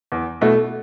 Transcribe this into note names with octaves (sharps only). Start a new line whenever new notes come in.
E2
B2 A3 E4